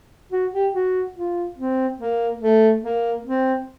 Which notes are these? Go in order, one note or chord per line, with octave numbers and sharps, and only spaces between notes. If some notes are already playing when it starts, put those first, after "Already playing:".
F#4
G4
F#4
F4
C4
A#3
A3
A#3
C4